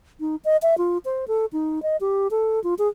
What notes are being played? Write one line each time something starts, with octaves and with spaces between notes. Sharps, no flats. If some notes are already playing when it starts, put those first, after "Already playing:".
D#4
D#5
E5
F4
C5
A4
D#4
D#5
G4
A4
F4
G#4